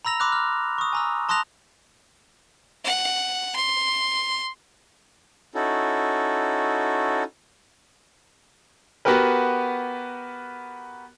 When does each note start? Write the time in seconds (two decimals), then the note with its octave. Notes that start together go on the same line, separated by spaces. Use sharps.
0.05 A#5 B5 E6 A#6 F7
0.20 B5 C6 D6 E6 F#6
0.32 F6
0.78 C#6 D#6
0.93 G#5 A#5 E6
1.29 A5 C6 D#6 F#6 A#6 F7
2.85 F#5
3.56 C6
5.55 C#4 D#4 E4 F#4 A4
9.05 B3 F#4 G4 A#4 B4